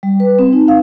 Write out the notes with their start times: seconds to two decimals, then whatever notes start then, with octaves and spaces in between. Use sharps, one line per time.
0.03 G3
0.20 B4
0.39 C4
0.53 D#4
0.68 F5